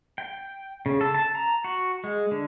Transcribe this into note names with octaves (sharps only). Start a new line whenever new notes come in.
G5
C#3
A4
A5
A#5
F#4
G#3
D3